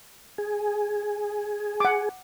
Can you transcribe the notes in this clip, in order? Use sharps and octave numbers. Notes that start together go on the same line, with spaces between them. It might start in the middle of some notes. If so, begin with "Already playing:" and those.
G#4
F#5 D6